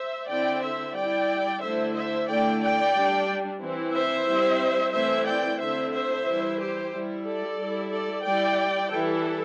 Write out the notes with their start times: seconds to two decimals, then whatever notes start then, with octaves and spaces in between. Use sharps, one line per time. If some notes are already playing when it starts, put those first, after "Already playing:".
Already playing: C5 E5
0.29 D3 C4 E4 D5 G5
0.63 C5 E5
0.96 G3 E4 D5 G5
1.62 D3 A3 E4 C5 E5
1.95 C5 E5
2.29 D3 A3 E4 D5 G5
2.61 D5 G5
2.94 G3 D4
3.61 E3 C4 E4
3.94 C5 E5
4.27 G3 C4 E4
4.93 E3 A3 C4 E4 C5 E5
5.27 D5 G5
5.60 D3 C4 E4 C5 E5
5.93 C5 E5
6.26 E3 G3 E4
6.59 G4 C5
6.93 G3 E4
7.26 A4 D5
7.59 G3 E4
7.92 A4 D5
8.25 G3 E4 D5 G5
8.91 E3 G3 E4 A4